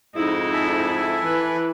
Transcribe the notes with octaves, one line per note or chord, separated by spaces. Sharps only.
F2 G#2 D#4 E4
A4 E5 G#5
E3 B4